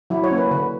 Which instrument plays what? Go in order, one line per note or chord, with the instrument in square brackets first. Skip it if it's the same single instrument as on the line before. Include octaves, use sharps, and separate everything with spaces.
[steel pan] F#3 E4
C#5
A#3 C#4
B4
D3 B4